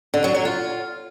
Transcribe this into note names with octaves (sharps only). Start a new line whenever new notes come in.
D3
F#3
F#3
F4